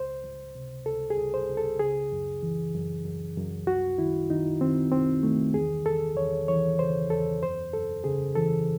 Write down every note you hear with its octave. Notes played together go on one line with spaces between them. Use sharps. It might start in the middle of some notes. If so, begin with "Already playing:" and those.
Already playing: C#2 C5
C#2
C3
C#2 A4
G#4
C#2
C5
C#2
A4
C#3 G#4
F#2
E3
F#2
F#2
F#2
C2 F#4
D#3 E4
D#3 D#4
D#3 C4
C2 C4
D#3 A3
E2 G#4
E2 A4
E2 C#5
E3 C#5
C#3 C5
E2 A4
F#2 C5
F#2 A4
C#3 G#4
E3 A4